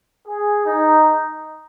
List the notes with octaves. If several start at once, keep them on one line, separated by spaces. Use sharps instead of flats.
G#4
D#4